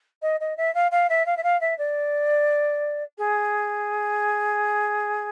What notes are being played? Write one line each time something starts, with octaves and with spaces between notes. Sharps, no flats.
D#5
D#5
E5
F5
F5
E5
F5
E5
F5
E5
D5
G#4